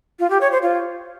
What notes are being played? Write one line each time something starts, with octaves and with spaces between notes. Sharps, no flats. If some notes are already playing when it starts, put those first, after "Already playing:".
F4
G4
C#5
C5
F4